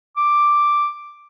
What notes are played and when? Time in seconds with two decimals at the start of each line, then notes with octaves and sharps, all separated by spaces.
0.17 D6